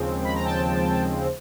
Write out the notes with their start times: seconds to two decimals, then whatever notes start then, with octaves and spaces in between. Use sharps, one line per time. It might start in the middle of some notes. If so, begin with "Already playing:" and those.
Already playing: D#2 C#3 F3 G#3 C4
0.25 B5
0.35 A#5
0.45 G5 A5